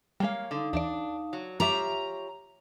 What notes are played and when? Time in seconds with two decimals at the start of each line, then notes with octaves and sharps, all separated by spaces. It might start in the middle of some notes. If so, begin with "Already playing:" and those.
0.20 G3 G#3 A#3 C#5 F5
0.51 D3 D#4 F5 D#6
0.73 D#2 E3 D4 D5
1.33 F#3
1.60 F4 G4 C#5 E5 A#5 C#6